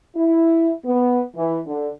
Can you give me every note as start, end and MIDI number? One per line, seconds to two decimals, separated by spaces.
0.16 0.70 64
0.85 1.20 59
1.36 1.59 52
1.67 1.88 50